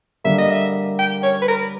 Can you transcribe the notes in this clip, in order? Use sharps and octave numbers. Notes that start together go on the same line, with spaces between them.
D3 G3 A#3 E5
D#5
E5
G5
C#5
B4
A#4